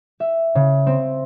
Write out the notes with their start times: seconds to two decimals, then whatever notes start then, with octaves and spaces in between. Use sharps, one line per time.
0.20 E5
0.55 C#3
0.87 C4